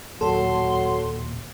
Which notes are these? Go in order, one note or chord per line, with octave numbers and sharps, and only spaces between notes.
D#2 A#2 F#3 A4 C6